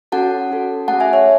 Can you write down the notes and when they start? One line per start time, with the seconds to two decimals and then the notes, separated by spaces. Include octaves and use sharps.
0.12 C#4 F#4 A4 F#5 A5
0.50 C#4 F#4 A4
0.88 A3 C#4 G#4 F#5 A5
1.00 E5 G#5
1.13 C#5 E5